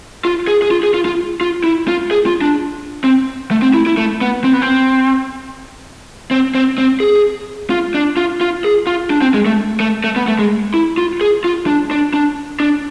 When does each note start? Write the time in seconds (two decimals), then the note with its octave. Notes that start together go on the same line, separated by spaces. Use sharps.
0.25 F4
0.47 G#4
0.62 G#4
0.71 F4
0.83 G#4
0.94 F4
1.05 F4
1.41 F4
1.64 E4
1.88 F4
2.11 G#4
2.26 F4
2.41 D4
3.04 C4
3.51 A3
3.62 C4
3.74 E4
3.86 E4
3.97 A3
4.21 B3
4.44 C4
4.53 B3
4.62 C4
6.31 C4
6.55 C4
6.78 C4
7.00 G#4
7.70 F4
7.94 D4
8.17 F4
8.41 F4
8.64 G#4
8.87 F4
9.10 D4
9.22 C4
9.34 G#3
9.46 A3
9.80 A3
10.04 A3
10.16 B3
10.28 A3
10.39 G#3
10.74 E4
10.98 F4
11.21 G#4
11.44 F4
11.67 D4
11.91 D4
12.14 D4
12.60 D4